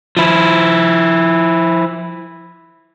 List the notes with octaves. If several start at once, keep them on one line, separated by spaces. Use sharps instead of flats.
F3 E4